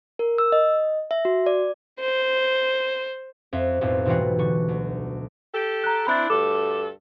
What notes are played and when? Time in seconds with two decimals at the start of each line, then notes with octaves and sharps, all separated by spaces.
0.19 A#4
0.38 E6
0.52 D#5
1.11 E5
1.25 F#4
1.46 D5
2.00 C5
3.53 F2 E5
3.81 B1 F2 A2
4.06 G#2 B2 E3 G3 F4 F#4
4.39 D3 C#6
4.68 D2
5.54 G4 A4
5.84 A#5 F#6
6.07 C4 D4 E4 B5 F#6 A6
6.30 D2 G2 A4 D6